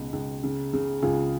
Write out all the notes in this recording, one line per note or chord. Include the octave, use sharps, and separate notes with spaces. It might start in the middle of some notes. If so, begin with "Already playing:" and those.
Already playing: C#2 B2
C#2
C#3
C#3
C#2 F4 G#4